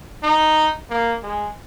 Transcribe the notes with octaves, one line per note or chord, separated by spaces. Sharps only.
D#4
A#3
G#3